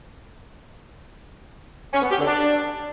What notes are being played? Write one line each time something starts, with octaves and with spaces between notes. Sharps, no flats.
C#4
B3
G4
D3
D4